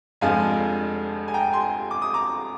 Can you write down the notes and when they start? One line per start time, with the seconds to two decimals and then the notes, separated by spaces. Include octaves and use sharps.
0.21 F1 F2 D3 F3 G#3 F5 G#5
1.28 G#5
1.34 G5 A#5
1.53 G#5 C6
1.91 D6
2.02 D#6
2.14 A#5 D6